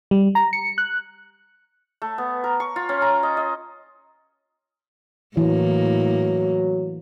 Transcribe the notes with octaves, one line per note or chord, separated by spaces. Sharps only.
G3
A#5
C#7
F#6
A3
B3
A#4
C#6
F4
C#4
A#5
D#5
D#5
A2 E3 F#3 A#3